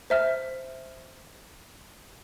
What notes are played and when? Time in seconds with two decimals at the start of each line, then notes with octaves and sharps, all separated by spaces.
0.10 C5 E5 F6